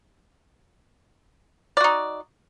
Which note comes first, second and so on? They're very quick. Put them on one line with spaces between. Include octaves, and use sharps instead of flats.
D5 F#4 D#4